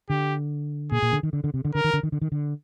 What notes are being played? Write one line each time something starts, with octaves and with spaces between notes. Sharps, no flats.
D3 G4
A#2 G#4
A#2
D3
D#3
D3
D3
C3
D3
D3 A#4
D#3
D3
D#3
D3
D#3
D3